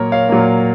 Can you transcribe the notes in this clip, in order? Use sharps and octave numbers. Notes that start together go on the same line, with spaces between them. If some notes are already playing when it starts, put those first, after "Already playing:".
Already playing: A#2 F#3 A#3 A#4 C#5
C#5 F5
A#2 F#3 A#3